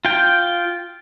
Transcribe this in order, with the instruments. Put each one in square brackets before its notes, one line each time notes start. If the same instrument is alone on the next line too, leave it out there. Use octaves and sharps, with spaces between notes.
[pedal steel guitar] F4 G5